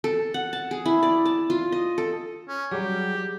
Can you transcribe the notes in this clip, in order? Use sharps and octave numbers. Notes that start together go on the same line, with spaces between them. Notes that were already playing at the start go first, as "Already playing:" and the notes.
A4
F#5
A5
G#4
E4
D5
A5
F4
D#5
A4
C#4
F#3 G3 G4 G#4